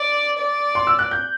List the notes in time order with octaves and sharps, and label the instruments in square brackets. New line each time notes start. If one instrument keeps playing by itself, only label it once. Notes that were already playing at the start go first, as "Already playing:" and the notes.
Already playing: [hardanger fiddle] D5
D5
[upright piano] C6
E6
F#6
G6